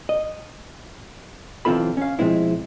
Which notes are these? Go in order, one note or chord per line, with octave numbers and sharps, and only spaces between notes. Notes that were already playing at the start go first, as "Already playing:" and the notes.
D#5
B1 E3 C4 F4 A4 B5
C#4 F5
B2 F3 G#3 C4 E4